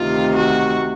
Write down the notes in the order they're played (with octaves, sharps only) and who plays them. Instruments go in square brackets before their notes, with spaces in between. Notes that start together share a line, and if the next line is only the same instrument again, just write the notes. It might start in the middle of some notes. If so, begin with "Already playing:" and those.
Already playing: [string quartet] D2 C3 D#3 F4
F#4